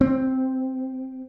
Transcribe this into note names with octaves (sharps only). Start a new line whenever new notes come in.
C4